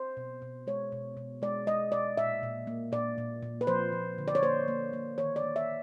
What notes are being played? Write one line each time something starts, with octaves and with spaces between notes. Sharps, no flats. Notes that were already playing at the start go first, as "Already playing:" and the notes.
Already playing: C5
B2
B2
G#3 C#5
B2
B2
G#3 D5
G#3 D#5
B2 D5
A#2 E5
A#2
A#3
A#2 D5
A#2
A#2
B4
F3 C5
F3
D3
D5
C#5
A#3 C5
A#3
A#3
D#3 C#5
D5
A#3
E5